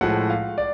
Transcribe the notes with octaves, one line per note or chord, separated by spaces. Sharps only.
A2 F3 G#3 F#5
F5
D5